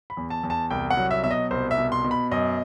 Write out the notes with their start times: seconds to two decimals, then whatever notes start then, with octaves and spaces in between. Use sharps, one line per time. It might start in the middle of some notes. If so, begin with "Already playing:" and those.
0.10 B5
0.17 E2
0.30 A5
0.43 E2
0.50 A5
0.71 C2 G5
0.91 F#5
0.97 F#3
1.11 E5
1.24 B2 E5
1.31 D#5
1.51 C2 C5
1.71 E5
1.78 B2
1.92 C6
2.04 B2
2.11 B5
2.31 F#2 D#5